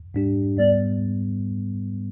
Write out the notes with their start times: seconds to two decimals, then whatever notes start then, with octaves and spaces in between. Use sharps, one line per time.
0.14 G#2 G3 D4 G4
0.57 G#2 G3 B3 D5